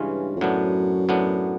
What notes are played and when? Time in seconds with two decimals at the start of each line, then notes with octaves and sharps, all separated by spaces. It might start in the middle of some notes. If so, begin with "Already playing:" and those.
Already playing: G2 C#3 E3 G#3 C#4 F4
0.36 F2
0.41 F#2 A2 F#3 B3 D4
1.09 A2 F#3 B3 D4